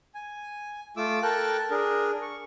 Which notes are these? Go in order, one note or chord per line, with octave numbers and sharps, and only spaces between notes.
G#5
A3 F4 D6 E6
A4 A#4 G5 A5 F#6
D4 G#4 A#4
C#6